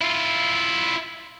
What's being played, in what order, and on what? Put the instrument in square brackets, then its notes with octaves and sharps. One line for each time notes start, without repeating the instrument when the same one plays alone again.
[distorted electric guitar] E4 F4